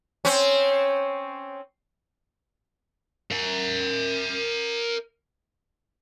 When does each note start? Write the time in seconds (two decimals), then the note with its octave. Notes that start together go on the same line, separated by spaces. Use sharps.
0.25 C4 C#4
3.31 A#4 E5